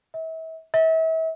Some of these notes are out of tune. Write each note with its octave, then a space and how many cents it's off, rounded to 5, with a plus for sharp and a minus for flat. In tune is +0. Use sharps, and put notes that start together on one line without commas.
E5 -35
E5 -35